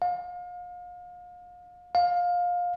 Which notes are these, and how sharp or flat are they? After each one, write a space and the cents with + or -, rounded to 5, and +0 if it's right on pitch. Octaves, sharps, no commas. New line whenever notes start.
F5 +35
F5 +20